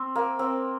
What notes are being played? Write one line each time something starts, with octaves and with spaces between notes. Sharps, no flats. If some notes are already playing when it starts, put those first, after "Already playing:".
Already playing: C4
A#3
C4